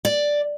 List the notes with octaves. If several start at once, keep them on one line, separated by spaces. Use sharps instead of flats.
D5